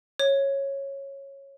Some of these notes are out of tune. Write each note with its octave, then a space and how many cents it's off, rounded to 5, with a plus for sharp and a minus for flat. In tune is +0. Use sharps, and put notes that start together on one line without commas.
C#5 -10